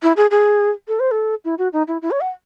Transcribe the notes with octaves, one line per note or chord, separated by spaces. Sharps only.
E4
G#4
G#4
A4
C5
A4
E4
F#4
D#4
E4
E4
C#5
F#5